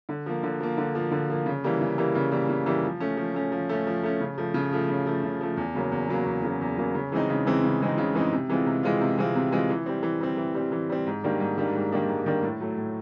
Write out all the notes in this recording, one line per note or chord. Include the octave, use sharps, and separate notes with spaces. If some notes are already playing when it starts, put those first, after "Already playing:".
D3
F3 A#3
D3
F3 A#3
D3
F3 A#3
D3
F3 A#3
C#3
E3 G3 A#3
C#3
E3 G3 A#3
C#3
E3 G3 A#3
C#3
E3 G3 A#3
F3
A3 C#4
F3
A3 C#4
F3
A3 C#4
F3
A3 C#4
C#3
F3 A3
C#3
F3 A3
C#3
F3 A3
C#3
F3 A3
E2
C#3 F#3 A#3
E2
C#3 F#3 A#3
E2
C#3 F#3 A#3
E2
C#3 F#3 A#3
C#3
E3 G#3 C4 D#4
C#3
E3 G#3 C4 D#4
C#3
E3 G#3 C4 D#4
C#3
E3 G#3 C4 D#4
C3
E3 G#3 C4 F4
C3
E3 G#3 C4 F4
C3
E3 G#3 C4 F4
C3
E3 G#3 C4 F4
E3
G3 C4
E3
G3 C4
E3
G3 C4
E3
G3 C4
G#2
D#3 G3 A#3 D4
G#2
D#3 G3 A#3 D4
G#2
D#3 G3 A#3 D4
G#2
D#3 G3 A#3 D4
A2
F#3 A3
A2